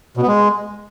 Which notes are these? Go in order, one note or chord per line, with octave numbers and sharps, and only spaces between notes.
B2
B3
G#3